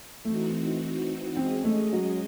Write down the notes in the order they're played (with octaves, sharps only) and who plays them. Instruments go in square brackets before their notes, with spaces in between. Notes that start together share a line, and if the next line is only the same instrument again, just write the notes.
[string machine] E3 C4 D#4 F#4 [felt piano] A3
[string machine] G#3 C#4 G#4 D#5 [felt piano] C4
[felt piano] A3
F#3